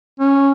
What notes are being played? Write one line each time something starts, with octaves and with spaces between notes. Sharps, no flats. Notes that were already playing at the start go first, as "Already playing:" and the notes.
C#4